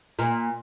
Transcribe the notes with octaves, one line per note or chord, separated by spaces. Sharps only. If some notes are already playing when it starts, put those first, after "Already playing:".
A#2